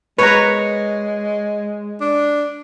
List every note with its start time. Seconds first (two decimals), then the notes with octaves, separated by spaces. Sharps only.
0.19 G#3 F#4 B4 C#5 A#5
2.01 D4